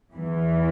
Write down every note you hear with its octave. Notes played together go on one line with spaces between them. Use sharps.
E2 E3